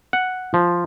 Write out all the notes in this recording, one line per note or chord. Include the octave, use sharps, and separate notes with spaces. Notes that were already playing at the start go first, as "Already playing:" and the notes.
F#5
F3